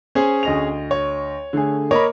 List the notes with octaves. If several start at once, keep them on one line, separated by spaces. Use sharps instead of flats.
C#4 G#4 C5
D2 D#5 F7
C#5
D3 A3 G#4
A#3 A#4 C#5 D#5 B5